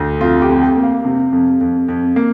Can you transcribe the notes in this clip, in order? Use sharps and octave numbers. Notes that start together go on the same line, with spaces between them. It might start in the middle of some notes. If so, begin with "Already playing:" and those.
Already playing: D2
F2 F4
G4
F2
G5
A#3
F5
C3
F2
F2
F2
A#3